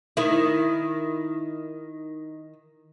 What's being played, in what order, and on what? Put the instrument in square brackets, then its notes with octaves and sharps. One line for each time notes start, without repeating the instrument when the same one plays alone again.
[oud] D#3 E4